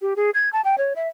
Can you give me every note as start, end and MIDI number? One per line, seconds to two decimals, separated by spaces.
0.02 0.14 67
0.16 0.30 68
0.34 0.49 92
0.53 0.61 81
0.64 0.76 79
0.78 0.93 73
0.96 1.08 76